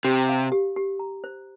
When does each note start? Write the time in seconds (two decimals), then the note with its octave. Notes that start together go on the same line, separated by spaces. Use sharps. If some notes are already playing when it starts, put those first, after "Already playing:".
0.04 C3 G4
0.29 F5
0.52 G4
0.76 G4
0.99 A#5
1.24 C5